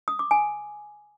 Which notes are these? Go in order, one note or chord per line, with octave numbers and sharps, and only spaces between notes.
D#6
D6
G#5